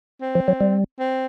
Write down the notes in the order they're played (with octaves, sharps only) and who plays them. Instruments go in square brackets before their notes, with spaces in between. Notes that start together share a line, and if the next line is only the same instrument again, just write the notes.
[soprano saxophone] C4
[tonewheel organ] F3
F#3
G3
[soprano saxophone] C4